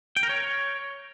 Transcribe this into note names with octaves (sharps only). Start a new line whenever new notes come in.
G5
A#4
C#5